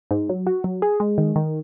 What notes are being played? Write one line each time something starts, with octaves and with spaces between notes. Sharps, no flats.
G#2
F#3
F#4
F#3
G#4
G#3
D#3
D#3